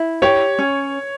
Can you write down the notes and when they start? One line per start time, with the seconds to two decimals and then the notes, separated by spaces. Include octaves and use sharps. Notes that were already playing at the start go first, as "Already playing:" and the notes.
Already playing: E4
0.22 G4 C#5
0.59 C#4